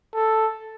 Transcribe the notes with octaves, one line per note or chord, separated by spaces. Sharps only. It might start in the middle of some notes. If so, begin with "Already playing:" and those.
A4